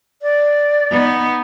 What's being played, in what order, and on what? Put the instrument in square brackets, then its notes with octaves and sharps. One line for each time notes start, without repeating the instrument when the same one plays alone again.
[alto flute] D5
[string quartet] B3 D#4